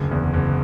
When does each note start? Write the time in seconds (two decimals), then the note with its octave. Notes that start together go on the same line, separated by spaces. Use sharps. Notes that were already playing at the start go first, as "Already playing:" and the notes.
Already playing: F#1 D2
0.11 E2
0.34 F#1